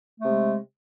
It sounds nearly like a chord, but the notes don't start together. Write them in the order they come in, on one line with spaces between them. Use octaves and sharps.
A3 C3 G#3